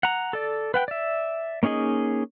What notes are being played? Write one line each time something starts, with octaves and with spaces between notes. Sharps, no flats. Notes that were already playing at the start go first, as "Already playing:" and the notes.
F#5 A#5
A4 D5
B4 F#5 G5
D5 E5
A#3 C#4 D#4 G#4 D#5